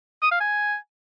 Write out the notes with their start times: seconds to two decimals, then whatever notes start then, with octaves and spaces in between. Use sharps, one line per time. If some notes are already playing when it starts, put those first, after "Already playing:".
0.22 D#6
0.31 F5
0.40 G#5